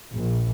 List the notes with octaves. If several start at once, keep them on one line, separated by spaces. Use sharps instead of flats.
A#1